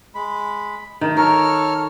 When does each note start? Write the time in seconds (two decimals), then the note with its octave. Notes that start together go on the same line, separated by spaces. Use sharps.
0.15 G#3 B5
1.01 D#3 A3
1.17 A4 A#4 C#5 F6